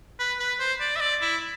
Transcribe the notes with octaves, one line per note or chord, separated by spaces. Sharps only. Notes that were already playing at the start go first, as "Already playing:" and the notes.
B4
B4
C5
D5
E5
D5
E4